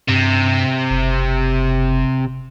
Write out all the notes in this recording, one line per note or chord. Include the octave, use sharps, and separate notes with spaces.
G2 C3
F#1